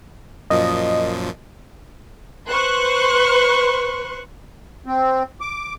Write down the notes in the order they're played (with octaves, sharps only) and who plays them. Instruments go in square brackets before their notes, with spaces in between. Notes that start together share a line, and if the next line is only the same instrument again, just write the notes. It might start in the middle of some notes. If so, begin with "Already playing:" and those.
[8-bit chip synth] F#2 A#2 F3 [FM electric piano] D#5
[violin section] B4 C5 C6 C#6 F#6
[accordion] C4
D6